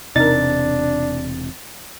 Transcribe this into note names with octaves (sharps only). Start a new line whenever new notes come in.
E1 C3 C4 D4 D#4 A#4 A6